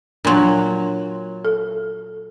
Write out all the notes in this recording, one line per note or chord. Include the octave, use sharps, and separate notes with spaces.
A#2 F#3 D4 C6
A4